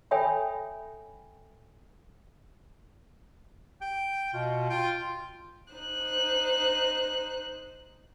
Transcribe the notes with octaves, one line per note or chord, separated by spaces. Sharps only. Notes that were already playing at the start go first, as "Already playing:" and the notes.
A4 C#5 E5 G5 G#5 B5
G5
B2 F4
F4 G5
D#4 C5 F#6